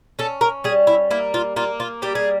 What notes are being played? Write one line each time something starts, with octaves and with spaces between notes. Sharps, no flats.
C#4 A4
A#4
G3 G#4
E4
A#3 E4
F4
A#3 F4
F4
G3 G4
G#4